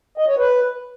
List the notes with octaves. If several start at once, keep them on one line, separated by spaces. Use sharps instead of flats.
D#5
C#5
B4